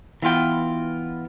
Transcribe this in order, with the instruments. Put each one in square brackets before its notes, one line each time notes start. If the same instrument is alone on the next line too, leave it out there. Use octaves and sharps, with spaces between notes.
[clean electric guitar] E3 B3 F4 G5